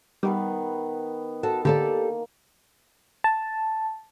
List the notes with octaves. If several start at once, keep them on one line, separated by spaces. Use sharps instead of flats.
D#3 G3 B3 B4
F#4 A4 A5
D3 A#3 G4 A4 D5
A5